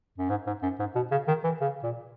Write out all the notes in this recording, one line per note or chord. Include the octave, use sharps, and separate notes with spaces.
F#2
G#2
G#2
F#2
G#2
B2
C#3
D#3
E3
C#3
A#2